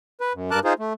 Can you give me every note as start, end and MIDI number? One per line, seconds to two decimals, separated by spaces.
0.21 0.33 71
0.34 0.51 42
0.51 0.60 43
0.51 0.60 70
0.51 0.60 81
0.51 0.60 86
0.51 0.60 90
0.65 0.73 63
0.65 0.73 65
0.65 0.73 68
0.65 0.73 72
0.79 0.93 57